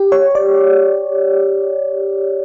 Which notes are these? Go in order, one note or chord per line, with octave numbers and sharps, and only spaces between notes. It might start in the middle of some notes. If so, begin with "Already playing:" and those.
Already playing: G4
C#5
D5